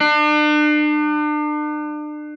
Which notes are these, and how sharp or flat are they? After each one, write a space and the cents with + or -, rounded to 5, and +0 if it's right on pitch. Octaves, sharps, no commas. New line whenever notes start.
D4 +40